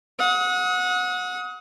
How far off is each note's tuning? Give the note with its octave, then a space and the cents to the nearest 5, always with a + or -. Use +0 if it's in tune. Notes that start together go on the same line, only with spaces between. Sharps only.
F#5 -25 D#6 +35